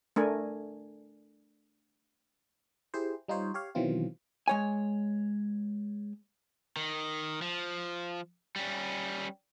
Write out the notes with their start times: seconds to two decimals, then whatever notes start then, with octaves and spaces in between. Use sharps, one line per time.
0.16 A3 D4 A#4 G#5
2.94 E4 G4 G#4 C5
3.28 G3 D#4 F4 C5 C#5
3.54 G4 C#5 F5
3.75 B2 D#3 E3 F#3 C4 F4
4.48 G#3 C#5 G#5
6.76 D#3
7.42 F3
8.56 G3 C#4